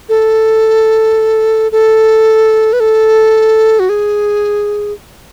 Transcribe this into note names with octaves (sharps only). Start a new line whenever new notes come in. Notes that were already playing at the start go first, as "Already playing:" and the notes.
A4
A4
B4
A4
F#4
G#4